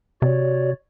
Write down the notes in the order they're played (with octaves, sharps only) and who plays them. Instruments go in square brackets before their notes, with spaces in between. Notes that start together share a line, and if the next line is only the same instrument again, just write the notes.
[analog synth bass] C3 [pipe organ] F#4 C#5 D5